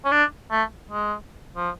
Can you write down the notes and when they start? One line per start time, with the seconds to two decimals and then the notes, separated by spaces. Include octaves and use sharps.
0.05 C#4
0.12 D4
0.51 A3
0.90 G#3
1.56 F3